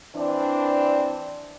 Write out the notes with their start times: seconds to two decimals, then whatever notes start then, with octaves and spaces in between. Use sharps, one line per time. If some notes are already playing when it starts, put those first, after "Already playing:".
0.15 E3 C4 D4